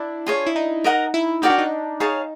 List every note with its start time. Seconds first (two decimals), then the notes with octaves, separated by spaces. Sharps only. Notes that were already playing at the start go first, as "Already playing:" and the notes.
Already playing: D4 E4
0.26 F4 G#4 C#5
0.46 E4
0.56 D#4
0.84 A#4 D#5 F#5 A#5
1.14 E4
1.42 D#4 F#4 A#4 D5 G5
1.50 D4
1.58 D#4
2.00 D#4 G#4 C#5 F5 A5